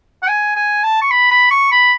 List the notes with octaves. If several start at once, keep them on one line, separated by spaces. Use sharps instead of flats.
F#5
G#5
G#5
A5
C#6
B5
B5
C#6
B5